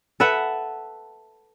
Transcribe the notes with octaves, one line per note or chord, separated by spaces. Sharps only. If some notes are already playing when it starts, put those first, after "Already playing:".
A4 B4 E5 F#5